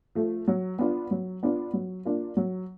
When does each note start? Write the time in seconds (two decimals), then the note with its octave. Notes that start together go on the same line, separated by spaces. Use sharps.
0.15 F3 A3
0.48 F#3
0.79 B3 D4 F4
1.11 F#3
1.43 B3 D4 F4
1.73 F#3
2.05 A#3 D4 F4
2.37 F#3